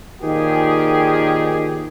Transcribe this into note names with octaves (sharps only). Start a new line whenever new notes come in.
A#2 D#3 F3 G4 G#4